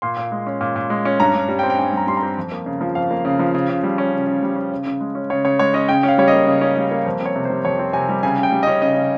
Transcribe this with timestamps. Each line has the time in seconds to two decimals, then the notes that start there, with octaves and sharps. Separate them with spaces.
0.02 A#2 C6
0.16 A#2
0.32 G#3
0.47 C#4
0.61 A#2
0.76 A#2
0.90 G#3
1.05 C#4
1.20 G2 A#5
1.34 G2
1.48 G3
1.59 G5
1.63 C4
1.70 G5
1.78 G2 G#5
1.93 G2 A#5
2.07 G3 C6
2.17 A#5
2.23 C4
2.37 F2
2.52 A#3
2.66 C#3
2.81 F3
2.95 F2 F5
3.11 A#3
3.25 C#3
3.39 F3
3.55 C#3
3.69 C#3
3.83 G3
3.98 C#4
4.13 C#3
4.27 C#3
4.43 G3
4.56 C#4
4.71 C#3
4.86 C#3
5.01 G#3
5.15 C#4
5.30 C#3 C#5
5.45 C#3 C#5
5.59 G#3 C#5
5.74 C#4 D#5
5.89 C#3 G5
6.03 C#4
6.08 F5
6.18 G3 C#5
6.28 A#3 D#5
6.47 C#3
6.62 C#4
6.77 G3
6.91 A#3
7.05 F2 C5
7.21 C4 C#5
7.36 C3
7.45 G3 C5
7.65 F2 C#5
7.79 C4
7.93 C3 G#5
8.09 G3
8.23 C#3 G#5
8.38 C#3
8.43 G5
8.52 G3
8.63 C#4 D#5
8.82 C#3 D#5
8.97 C#3